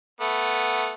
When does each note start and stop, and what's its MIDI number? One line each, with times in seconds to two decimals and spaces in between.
0.21 0.92 57
0.21 0.92 59